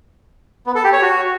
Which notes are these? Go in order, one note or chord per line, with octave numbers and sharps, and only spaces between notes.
B3
A4
G4
C#5
F#4